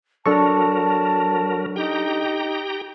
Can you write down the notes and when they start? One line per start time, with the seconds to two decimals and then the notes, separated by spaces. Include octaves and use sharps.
0.26 F#3 D4 A4 A#4 A5 C#6
1.76 D#4 G4 G5 A#5